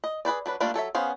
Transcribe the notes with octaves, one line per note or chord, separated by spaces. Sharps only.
D#5
G#4 B4 C5 D5
F#3 D4 B4
G3 A3 A#3 D4 F4
F#3 A4 C#5 E5
B3 C#4 G#4 C5 F5